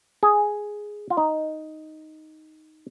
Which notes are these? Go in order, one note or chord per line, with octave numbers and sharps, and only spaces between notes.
G#4
F4
D#4